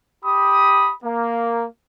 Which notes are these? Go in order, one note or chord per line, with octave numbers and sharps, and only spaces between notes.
G4 B5 D#6
A#3